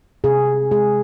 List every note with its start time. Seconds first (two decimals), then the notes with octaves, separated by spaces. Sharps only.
0.24 C3 G#4
0.71 G#3 G#4